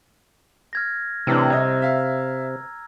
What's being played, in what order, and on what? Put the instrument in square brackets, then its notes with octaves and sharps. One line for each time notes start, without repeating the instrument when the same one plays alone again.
[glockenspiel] F6 G#6 A#6
[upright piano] A2 E3 D4 [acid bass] C3 [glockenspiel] A#5 E6 F6
[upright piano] C2 D#5 [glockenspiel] G#6
[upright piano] E5 F5